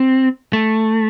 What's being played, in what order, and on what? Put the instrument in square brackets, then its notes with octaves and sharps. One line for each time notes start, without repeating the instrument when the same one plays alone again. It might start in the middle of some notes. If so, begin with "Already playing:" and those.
Already playing: [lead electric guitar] C4
A3